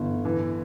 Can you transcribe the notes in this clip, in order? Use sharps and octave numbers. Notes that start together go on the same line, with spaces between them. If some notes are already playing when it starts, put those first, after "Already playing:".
Already playing: G1 E3
E3